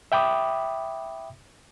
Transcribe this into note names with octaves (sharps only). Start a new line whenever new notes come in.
E5 G5 B5 D6 D#6